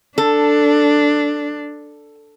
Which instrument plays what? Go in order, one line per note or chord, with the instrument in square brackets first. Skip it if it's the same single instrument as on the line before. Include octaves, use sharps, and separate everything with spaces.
[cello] D4 [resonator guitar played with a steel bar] A4